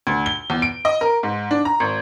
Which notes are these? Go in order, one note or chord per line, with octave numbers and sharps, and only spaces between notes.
D2
G7
E2
D7
D#5
A#4
G#2
D4
A#5
G#1